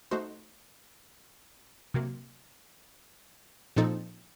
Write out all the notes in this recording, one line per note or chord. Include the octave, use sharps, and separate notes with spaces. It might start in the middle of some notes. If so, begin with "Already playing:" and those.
A3 D#4 F#4 C5
C3 F#3 A#3
A#2 F3 C4 D#4 A4